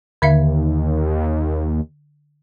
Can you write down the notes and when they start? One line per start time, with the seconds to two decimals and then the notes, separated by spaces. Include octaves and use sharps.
0.22 D#2 D3 E5 F5